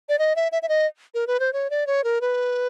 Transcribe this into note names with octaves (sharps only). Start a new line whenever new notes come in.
D5
D#5
E5
E5
E5
D#5
A#4
B4
C5
C#5
D5
C#5
A#4
B4